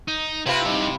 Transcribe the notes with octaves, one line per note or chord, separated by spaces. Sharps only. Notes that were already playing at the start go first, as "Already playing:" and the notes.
D#4
C3 C4 E4 F4 B4
G2 D#4 E4